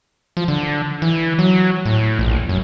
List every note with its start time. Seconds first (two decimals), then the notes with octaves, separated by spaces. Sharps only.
0.37 F3
0.48 D3
1.02 E3
1.39 F#3
1.85 A2
2.19 A#1
2.49 F#2